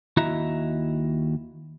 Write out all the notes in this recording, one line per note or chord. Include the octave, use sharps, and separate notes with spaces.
D#2 E4 F#4 D#5 E5 A#5